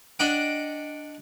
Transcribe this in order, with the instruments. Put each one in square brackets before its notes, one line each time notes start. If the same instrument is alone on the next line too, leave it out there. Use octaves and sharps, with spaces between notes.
[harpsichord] D4 D#5 F#5 G5